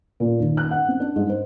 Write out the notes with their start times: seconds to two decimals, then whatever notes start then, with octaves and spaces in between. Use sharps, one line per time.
0.20 A#2
0.39 D#2
0.57 F#6
0.71 F#5
0.88 C4
1.00 D4
1.16 G#2
1.29 C5